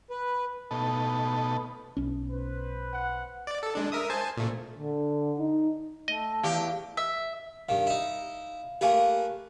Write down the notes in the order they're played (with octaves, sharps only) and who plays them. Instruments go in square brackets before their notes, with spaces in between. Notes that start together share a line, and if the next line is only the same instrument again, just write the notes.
[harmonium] B4
[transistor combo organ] B2 A3 B3 D#4 A4
[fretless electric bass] B1 C#4
[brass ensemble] B4 C5
[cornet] F#5
[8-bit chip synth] D5
A4
G#3 D4
A#4 E5 D#6
C5 G#5 A5
A#2 A3
[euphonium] D3
D#4
[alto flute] A3 [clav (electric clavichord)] D#5
[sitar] E2 G4 [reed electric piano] F5
[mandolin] E5
[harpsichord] G2 D#3 [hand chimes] F5
[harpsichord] D#4 E4
[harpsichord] A3 A#3 B4 [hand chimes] G4 F5 G#5